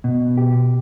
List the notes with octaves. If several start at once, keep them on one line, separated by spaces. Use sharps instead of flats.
B2
G4